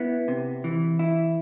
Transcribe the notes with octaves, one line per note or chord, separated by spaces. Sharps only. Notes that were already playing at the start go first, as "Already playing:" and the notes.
Already playing: B3 E4
C3
E3
E4